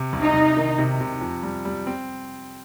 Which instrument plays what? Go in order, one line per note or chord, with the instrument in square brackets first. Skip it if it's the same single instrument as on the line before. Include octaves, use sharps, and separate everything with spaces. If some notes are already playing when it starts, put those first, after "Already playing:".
Already playing: [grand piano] C3
C2
[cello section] D#4
[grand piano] C2
D#3
C3
C3
F2
G3
G3
C4